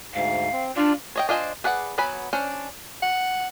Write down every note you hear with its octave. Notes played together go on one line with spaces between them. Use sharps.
D2 G#2 F5
C4
D4 F4 D5
C#5 D#5 G5
D4 F4 C5 D#5 G#5
G#4 B4 D5 F#5
F#3 B3 B4 G#5 B5
C#4 D4 C5
F#5